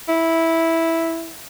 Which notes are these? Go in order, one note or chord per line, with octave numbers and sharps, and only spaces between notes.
E4